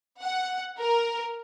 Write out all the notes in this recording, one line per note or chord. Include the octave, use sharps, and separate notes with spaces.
F#5
A#4